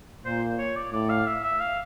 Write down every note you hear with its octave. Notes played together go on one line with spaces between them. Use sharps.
A#2 C5
C#5
D5
A2 D5
F5
E5
E5
F5